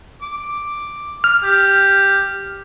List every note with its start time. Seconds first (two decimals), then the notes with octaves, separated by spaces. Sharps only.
0.22 D6
1.24 F6
1.43 G4